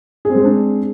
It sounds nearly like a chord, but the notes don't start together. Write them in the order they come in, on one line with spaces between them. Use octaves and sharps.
G#4 C4 G#3 C5 D4